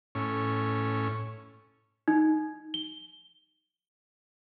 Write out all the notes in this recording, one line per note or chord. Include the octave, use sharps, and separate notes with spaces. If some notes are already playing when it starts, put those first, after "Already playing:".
A2 C#4
D#4
G7